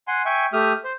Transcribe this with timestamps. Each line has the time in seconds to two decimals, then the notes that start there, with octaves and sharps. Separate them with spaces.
0.08 F#5 G#5 C6
0.26 E5 G5 G#5 C#6
0.53 A3 G4 E5 D#6 F6
0.85 C5